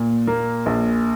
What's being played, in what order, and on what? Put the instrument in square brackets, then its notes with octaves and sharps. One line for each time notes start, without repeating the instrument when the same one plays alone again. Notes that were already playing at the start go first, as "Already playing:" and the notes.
Already playing: [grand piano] A#2
A#3
A#1